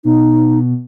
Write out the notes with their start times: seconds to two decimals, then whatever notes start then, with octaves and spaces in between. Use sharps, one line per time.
0.05 B2 D#4